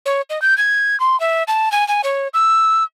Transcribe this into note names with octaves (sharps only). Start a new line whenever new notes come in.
C#5
D#5
G6
G#6
C6
E5
A5
G#5
G#5
C#5
E6